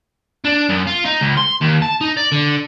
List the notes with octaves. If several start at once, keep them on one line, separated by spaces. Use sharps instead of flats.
D4
F#2
F4
D#4
C#2
C6
D#2
A5
D#4
D5
D3